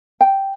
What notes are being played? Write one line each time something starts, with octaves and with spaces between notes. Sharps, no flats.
G5